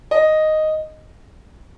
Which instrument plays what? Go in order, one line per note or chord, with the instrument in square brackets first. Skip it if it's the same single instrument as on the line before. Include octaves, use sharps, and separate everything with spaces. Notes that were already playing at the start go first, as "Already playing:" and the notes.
[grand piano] D#5